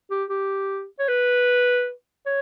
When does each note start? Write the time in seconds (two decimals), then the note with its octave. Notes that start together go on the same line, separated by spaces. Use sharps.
0.11 G4
0.30 G4
0.99 C#5
1.08 B4
2.26 C#5